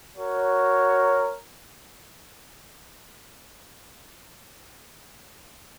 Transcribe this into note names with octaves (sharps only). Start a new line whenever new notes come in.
F#4 A#4 C#5